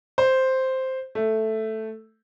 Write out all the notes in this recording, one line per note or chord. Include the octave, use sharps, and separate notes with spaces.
C5
A3